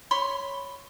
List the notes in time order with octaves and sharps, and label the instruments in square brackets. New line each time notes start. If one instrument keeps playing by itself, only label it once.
[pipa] C#5 B5 C6